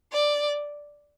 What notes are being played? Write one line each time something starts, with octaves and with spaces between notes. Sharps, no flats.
D5